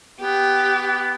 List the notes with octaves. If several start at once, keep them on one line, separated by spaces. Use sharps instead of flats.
B3 G4